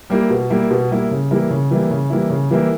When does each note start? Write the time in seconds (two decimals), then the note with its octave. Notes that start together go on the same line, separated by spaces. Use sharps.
0.10 G3 A#3 E4
0.30 B2
0.50 G3 A#3 E4
0.71 B2
0.91 G3 A#3 E4
1.11 C#3
1.31 E3 G3 A#3 E4
1.50 C#3
1.71 E3 G3 A#3 E4
1.91 C#3
2.10 E3 G3 A#3 E4
2.30 C#3
2.51 E3 G3 A#3 E4